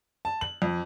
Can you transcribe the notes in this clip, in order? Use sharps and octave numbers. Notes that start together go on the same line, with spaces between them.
A5
F#7
F2